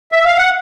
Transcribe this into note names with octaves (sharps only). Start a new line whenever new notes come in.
E5
F5
F#5